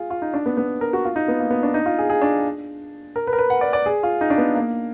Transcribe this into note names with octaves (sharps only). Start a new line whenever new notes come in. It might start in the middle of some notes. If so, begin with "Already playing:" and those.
Already playing: F4 G#4
F4
D#4
D4
B3
B3
A#4
F#4
F4
D#4
B3
A#3
B3
D4
D#4
F4
G#4
G#4
D4
A#4
B4
A#4
B4
F#5
D5
D5
G#4
F4
D#4
D4
B3
A#3